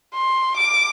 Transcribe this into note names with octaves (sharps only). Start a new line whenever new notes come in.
C6
D6